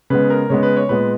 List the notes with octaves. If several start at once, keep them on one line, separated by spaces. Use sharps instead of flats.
C#3 G#3 B3 B4
A#4
C#3 G#3 B3 C#5
B4
C#5
A#2 G#3 B3 B4